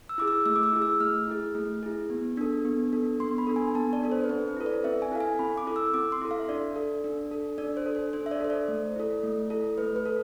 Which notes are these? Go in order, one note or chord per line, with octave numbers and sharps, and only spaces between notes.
E6
E4 G#4 D6
E6
A3 E6
D6
E6
E4 G#4
E6
A3 F6
E4 G#4
A3
E4 G#4
B3
D4 A4
B3
D4 A4
B3 C6
B5
D4 A4
G#5
B3 A5
D5
D4 A4
C5
B4
C4 C5
B4
E4 A4
D5
C4 E5
G#5
E4 A4 F5
G#5
C4 B5
D6
E4 A4
E6
C4 D6
C6
E4 A4
F5
E5
D4 D5
A4
D4
A4
D4 D5
C5
A4
C5
D4 C5
E5
D5
A4 C5
D5
A3
E4 A4
A3
E4 A4
A3 B4
B4
A4